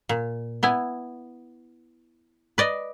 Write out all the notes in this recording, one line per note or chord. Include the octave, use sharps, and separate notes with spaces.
A#2
B3 E4 G#5
B4 D5 D#5